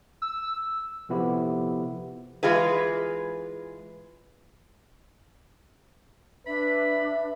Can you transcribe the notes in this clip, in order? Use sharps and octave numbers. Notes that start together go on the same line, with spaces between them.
E6
C3 F3 B3 E4 G4 A4
E3 G#3 F4 G#4 B4
D4 B4 E5 B5